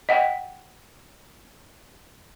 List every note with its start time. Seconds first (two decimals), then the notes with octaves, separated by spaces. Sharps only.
0.09 D#5 F#5 G5